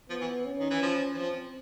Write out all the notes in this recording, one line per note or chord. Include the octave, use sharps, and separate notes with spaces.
F3 B3
E3
C#4
D#3
E3
F3
E3
F3 C4